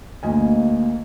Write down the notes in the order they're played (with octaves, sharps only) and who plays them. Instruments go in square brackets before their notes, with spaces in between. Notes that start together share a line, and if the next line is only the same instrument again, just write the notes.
[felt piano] D2 D#5 G#5 [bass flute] A#3